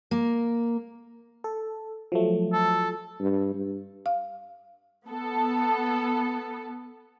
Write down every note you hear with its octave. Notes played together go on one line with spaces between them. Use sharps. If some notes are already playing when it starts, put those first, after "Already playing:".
A#3
A4
F3 F#3 A3
A4
G2
G2
F5
B3 A4